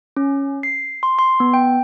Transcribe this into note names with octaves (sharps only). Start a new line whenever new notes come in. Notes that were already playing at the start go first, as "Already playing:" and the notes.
C#4
C7
C6
C6
B3
G5